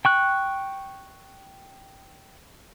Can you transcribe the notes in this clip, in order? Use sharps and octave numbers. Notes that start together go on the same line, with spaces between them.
G5 C#6 F#6